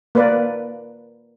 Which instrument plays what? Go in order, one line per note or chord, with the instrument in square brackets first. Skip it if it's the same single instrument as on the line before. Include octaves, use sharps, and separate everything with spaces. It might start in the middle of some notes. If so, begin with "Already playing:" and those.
[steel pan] A#3 A#4 B4 D5